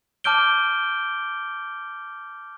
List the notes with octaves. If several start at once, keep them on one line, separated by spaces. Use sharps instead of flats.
A5 D6 F6 G6 D7 G7